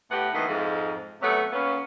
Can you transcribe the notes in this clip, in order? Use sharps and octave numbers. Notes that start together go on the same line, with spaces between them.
A2 B3 G4 F#5
D2 D#3 E3 A#3 B3
F2 G#2
C3 F#3 A3 B3
A#2 B3 C#4